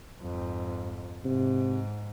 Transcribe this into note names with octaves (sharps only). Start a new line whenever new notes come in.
F2 G#2
G#2 C3